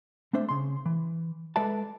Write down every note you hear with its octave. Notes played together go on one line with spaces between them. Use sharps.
A3 C4 D4 C5 E5
C#3 C6
E3
G#3 A4 B4 D5 E5 A5